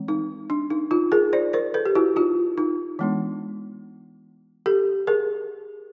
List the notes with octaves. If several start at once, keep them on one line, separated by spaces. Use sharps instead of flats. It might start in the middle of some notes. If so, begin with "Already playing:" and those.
Already playing: E3 G#3 C4
D#4
D4
D#4
D#4 F4
G#4 A#4
C5 D5
A#4 C5
A4 B4
G4
E4 F#4
D#4 F4
D#4
E3 G#3 B3 D4
G4 A4
G#4 A#4